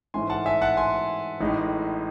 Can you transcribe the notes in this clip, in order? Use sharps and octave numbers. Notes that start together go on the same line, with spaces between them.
G#2 E3 A3 C#4 G#5 C6
F#5 A5
E5 G#5
F#5 A5
G#5 C6
A1 A2 G#3 D#4